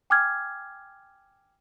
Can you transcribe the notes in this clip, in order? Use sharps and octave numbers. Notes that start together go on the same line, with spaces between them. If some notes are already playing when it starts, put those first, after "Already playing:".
G5 G#5 D6 E6 F6 G#6